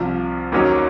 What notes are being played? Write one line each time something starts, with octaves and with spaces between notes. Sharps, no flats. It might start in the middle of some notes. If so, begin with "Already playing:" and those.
Already playing: C2 C3 F3
D#2 D#3 F#3 C#4